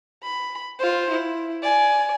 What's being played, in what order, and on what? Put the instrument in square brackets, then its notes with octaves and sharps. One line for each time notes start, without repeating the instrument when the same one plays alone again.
[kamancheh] B5
F4 C5
E4
D5 G#5